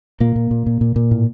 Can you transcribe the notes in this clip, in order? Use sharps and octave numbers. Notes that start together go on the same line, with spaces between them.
A#2 A#3
A#2
A#2
A#2
A#2
A#2
A2